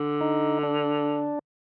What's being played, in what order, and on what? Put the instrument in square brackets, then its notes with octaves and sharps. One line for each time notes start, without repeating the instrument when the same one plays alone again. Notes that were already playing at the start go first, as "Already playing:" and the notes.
Already playing: [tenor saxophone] D3
[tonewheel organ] D#4
D4